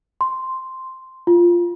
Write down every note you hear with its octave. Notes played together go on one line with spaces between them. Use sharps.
C6
F4